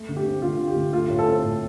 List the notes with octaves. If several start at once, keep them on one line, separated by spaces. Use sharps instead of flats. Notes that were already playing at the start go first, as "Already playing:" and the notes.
Already playing: A3
D3
G4
C4
D3 F4
A3
G4
D3
A3 F4
A2
A4
C4
A2